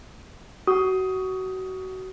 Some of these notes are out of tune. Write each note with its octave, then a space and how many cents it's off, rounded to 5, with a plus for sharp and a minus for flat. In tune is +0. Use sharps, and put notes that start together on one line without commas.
F#4 +25 D#6 +15